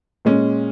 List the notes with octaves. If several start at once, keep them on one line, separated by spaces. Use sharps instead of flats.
A#2 G#3 C#4